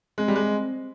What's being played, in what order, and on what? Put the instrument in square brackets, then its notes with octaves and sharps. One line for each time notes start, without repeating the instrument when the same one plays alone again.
[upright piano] G#3 [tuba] C4
[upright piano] G3
G#3